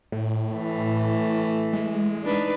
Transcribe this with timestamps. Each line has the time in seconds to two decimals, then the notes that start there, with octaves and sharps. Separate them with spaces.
0.12 A2
0.52 E3 A3
1.73 G#3
2.23 D4 D#4 B4